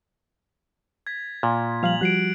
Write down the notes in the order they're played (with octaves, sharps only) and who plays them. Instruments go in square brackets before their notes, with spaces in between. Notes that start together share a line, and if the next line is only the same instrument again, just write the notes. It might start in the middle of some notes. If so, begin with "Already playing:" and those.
[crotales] G#6 A6 B6
[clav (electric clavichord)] A#2
[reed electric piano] F3 G3 F5 [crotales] F7 F#7
[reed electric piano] F3 G3 F#4 [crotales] F#6 C7 D7